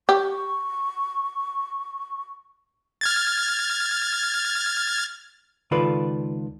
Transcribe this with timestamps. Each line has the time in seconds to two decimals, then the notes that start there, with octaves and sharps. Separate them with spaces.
0.09 G4 C#6
3.01 F6 G#6 A6
5.71 C#2 D#3 F4 A4 B4 D5